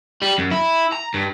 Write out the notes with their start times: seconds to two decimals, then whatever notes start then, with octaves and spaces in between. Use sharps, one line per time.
0.22 G3
0.38 F#2
0.51 E4
0.92 A#5
1.14 G2